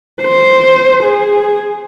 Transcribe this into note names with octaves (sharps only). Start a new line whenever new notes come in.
C5
G#4